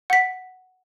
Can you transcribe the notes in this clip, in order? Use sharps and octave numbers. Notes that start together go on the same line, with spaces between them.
F#5 B6